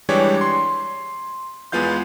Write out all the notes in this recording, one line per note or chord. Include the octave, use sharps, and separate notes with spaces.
E3 G3 G#3 D4 G4 C#5
C6
E2 G#3 B3 F4 F5 G6